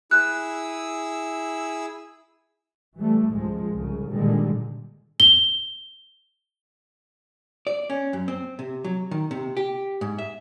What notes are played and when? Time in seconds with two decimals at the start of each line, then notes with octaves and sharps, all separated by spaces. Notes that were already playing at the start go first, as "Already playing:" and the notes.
0.11 E4 G#4 E6 F#6
2.97 E3 G3 A3
3.31 C#2 G#2 F3 G#3
3.73 C2 C#3
4.12 A#2 D3 D#3 G3 G#3
5.20 G7
7.67 D5
7.90 C#4
8.13 F#2
8.28 C4
8.59 C3
8.84 F#3
9.11 D#3
9.31 C3
9.57 G4
10.01 G#2
10.19 E5